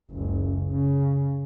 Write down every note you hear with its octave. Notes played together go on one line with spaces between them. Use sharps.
F#1 C#2
C#3